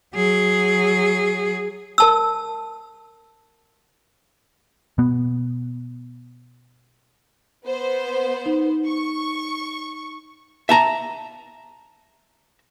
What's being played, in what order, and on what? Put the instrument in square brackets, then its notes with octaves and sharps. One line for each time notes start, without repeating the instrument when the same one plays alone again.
[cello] F#3 G#4
[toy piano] A#4 A5 E6
[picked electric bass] B2 B3
[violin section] B3 C5
[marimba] D#4
[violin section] C#6
[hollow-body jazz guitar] E5 A5 A#5